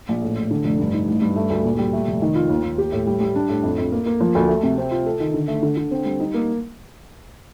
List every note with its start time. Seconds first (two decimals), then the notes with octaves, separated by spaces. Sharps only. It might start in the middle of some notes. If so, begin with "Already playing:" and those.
0.09 A#1
0.22 A2
0.36 A1
0.51 D3
0.64 F1
0.79 G2
0.94 D#4
1.08 A1
1.22 G2
1.36 A3
1.50 D2
1.64 A#2
1.78 G3
1.93 A3
2.08 F1
2.22 D#3
2.35 F4
2.49 D#2
2.63 D#2
2.78 G4
2.92 A2
3.07 G3
3.21 G3
3.35 D4
3.49 A2
3.63 F2
3.78 F2
3.92 A#3
4.06 A#3
4.21 F3
4.35 D2
4.49 A3
4.63 C3
4.77 C4
4.91 F4
5.06 A4
5.20 D#3
5.34 D3
5.48 A3
5.62 D3
5.77 D3
5.91 C4
6.05 G3
6.20 D#4
6.34 A#3